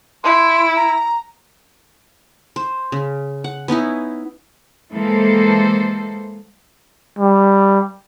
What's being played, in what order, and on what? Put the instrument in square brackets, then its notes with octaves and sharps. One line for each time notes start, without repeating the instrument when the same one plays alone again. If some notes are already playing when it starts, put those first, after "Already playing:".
[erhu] E4 [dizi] C6
[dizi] A#5
[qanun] C5
C#3
F#5
B3 C#4 D#4 E4
[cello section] E3 G#3 A#3 A4 C5
[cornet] G3